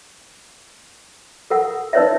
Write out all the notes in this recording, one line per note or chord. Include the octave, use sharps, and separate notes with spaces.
A4 A#4 F#5
D#4 A#4 B4 C#5 D5 E5